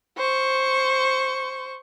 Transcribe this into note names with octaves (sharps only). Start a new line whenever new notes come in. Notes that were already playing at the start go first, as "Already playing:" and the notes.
C5 C#6